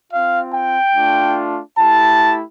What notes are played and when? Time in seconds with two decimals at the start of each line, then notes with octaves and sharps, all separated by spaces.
0.11 C4 F4 F5
0.53 G5
0.94 A3 D4 F4
1.77 A3 E4 G4 A5